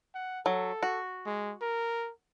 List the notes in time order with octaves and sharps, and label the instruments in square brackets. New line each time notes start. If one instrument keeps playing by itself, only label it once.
[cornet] F#5
[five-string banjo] F#3 [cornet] A4
[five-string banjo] F#4
[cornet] G#3
A#4